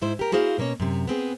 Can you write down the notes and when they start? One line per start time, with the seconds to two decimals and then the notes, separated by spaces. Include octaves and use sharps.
0.01 G#2 E4 C5
0.19 G4 A#4
0.32 A#3 E4 F#4 G#4 C5 F5
0.58 B2 A#3 C#4 C#5
0.80 F#2 C3
1.07 B3 C4 G#4